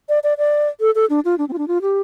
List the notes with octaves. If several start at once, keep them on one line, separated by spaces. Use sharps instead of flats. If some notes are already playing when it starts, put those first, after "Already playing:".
D5
D5
D5
A4
A4
D4
F4
D4
C4
F4
D4
F4
G4